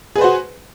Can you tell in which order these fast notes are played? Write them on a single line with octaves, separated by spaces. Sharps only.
G#4 B4 C5 F#4